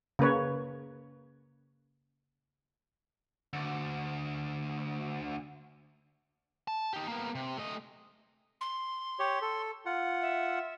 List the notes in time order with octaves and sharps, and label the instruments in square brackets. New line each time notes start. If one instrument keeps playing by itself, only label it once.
[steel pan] C#3 A#3 B4 C#5
[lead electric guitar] D2 D3
A5
D#4 G4
A#3 B3
C3
A3 D#5
[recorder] C6
[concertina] G4 C#5
A4
F4 F#5
[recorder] E5